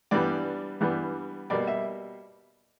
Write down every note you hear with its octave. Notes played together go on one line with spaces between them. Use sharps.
G2 E3 G3 B3 D5
G2 E3 G3 B3
B2 G3 A#3 D5
E5